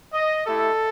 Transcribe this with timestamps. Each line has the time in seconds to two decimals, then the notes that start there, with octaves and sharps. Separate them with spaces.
0.13 D#5
0.47 A3 E4 G4 A4